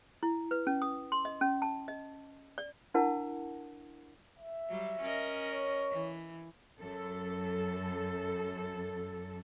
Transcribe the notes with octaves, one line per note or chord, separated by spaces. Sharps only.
E4
B4
C#4
D#6
C6
D#5
C#4
A5
D#5
D5
D4 E4 A#4 F#5 A5
E5
F#3 G3
C#4 A#4 D#5
C#5
E3
F#2 A4